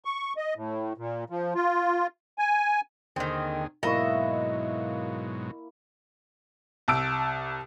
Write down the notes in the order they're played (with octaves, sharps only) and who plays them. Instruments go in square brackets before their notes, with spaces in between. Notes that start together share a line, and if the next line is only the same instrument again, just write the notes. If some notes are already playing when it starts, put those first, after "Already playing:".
[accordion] C#6
D#5
A2
A#2
F3
F4
G#5
[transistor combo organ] D#2 D3 G#4 [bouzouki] D#3 C4
[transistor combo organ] G#2 B2 F#3 [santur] A#3 E4 C#6 [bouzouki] D#5 E5
[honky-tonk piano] C2 A5 E6 D7